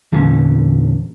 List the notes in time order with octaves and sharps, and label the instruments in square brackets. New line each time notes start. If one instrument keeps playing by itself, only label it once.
[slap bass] E2 A#2 D3 C#4